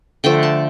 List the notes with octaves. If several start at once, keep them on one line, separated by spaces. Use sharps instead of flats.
D3 F3 A3 G5
A5